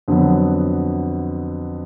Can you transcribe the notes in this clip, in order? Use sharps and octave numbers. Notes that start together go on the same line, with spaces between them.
F2 D3 F#3 B3